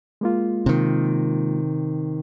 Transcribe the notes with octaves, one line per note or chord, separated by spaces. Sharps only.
G#3 A#3 F4
C3 D#3